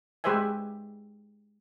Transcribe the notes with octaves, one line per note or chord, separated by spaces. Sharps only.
G#3 G4 B4 C5 E5 G#5